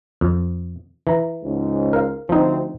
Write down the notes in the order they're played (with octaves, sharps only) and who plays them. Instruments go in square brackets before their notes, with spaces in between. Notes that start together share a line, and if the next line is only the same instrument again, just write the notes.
[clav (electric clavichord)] F2
E3 A#5
[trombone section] C#2 G#2
[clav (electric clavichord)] A#4 F5
[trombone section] D2 C4 [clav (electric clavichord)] F3 D#4